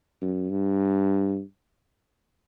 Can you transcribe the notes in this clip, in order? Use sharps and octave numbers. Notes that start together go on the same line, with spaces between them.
F#2
G2